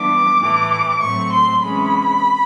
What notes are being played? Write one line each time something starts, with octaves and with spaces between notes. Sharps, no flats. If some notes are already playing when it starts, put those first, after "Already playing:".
Already playing: E3 G3 B3 D4 D6
A2 E3 A3
A2 F#3 A3 C4 C#6
C6
C3 E3 G#3 C#4 B5